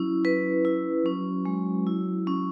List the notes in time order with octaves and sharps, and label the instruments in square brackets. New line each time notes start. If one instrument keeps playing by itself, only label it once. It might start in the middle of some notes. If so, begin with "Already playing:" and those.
Already playing: [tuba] F#3 [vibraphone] C#4 E4
[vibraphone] B4
E4
[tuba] F#3 [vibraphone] C#4
[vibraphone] G#3
E4
C#4